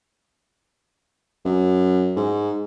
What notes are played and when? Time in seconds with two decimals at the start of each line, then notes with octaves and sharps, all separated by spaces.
1.45 F#2
2.16 G#2